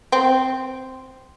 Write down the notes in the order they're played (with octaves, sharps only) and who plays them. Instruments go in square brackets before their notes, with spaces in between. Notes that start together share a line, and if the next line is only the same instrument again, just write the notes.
[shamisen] C4